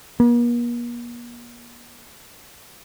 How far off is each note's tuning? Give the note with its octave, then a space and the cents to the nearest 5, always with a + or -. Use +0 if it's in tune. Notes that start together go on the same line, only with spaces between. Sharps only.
A#3 +45